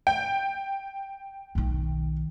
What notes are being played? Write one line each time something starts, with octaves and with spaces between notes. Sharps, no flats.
G5
B1 D#3